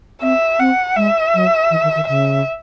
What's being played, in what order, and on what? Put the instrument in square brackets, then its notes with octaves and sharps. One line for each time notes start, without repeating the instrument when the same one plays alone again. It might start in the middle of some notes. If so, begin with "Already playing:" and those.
[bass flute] C4 [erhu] E5
[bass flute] C4 [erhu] F#5
[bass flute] G#3 [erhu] E5
[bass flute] F#3
E3
D#3
D#3
[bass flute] C#3 [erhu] E5